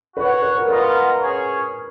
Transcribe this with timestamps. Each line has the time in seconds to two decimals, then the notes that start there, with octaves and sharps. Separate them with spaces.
0.16 F#4 B4 C#5 F#5
0.42 B4
0.57 A#4
0.68 B3 F4 A#4 B4 D#5 F#5
1.19 C#4 G#4 C#5